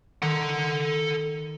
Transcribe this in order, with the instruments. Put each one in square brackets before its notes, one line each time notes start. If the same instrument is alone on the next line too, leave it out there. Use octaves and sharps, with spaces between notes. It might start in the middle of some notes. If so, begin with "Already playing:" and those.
[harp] D#3 [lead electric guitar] A4 F#5